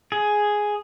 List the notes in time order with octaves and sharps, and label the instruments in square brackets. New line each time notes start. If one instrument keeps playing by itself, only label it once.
[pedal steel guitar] G#4